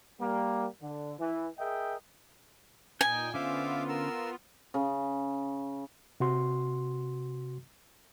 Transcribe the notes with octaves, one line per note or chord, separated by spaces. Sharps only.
G3 A#3
D3
E3
G#4 A#4 D#5 E5 G5
A#2 D#4 G5 G#5 G6
D3 B3 C#4 F4 C5 E5 F5 D6
A#4 E6
C#3
C3 F#4 C6